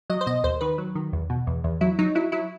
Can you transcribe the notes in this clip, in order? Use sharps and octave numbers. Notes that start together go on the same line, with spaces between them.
F#3 D#5
C5
B2 D#5
D#2 C5
D#3 B4
F#3
D#3
E2
B2
E2
E2
F#3 E4
F#3 D#4
F#3 E4
F#3 E4